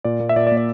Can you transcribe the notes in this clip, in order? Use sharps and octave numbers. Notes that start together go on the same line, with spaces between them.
A#2 D5
A#3
E5
A#2 D5
D5
A#3
D5